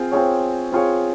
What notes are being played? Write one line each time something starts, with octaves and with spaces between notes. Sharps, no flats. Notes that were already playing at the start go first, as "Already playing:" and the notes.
Already playing: C4 F4 G#4
C4 F4 G#4 C#5
C4 F4 G#4 C#5